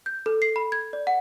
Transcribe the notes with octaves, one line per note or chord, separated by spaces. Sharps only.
G6
A4
C7
B5
G#6
D5
F#5